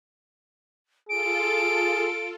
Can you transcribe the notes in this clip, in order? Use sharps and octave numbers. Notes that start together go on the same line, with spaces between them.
F4 G#4 A4 D7